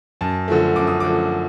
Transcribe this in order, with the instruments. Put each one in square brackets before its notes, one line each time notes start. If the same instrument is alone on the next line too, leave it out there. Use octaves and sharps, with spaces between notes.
[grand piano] F#2 A5
D3 F3 A3
F#2 D6
D#6
D3 F3 A3 D6